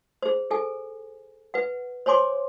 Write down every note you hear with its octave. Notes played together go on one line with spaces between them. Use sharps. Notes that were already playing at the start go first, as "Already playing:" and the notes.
G#4 C5
G#4 A4 G#5
B4 F#5
C5 C#5 G#5 C6 D6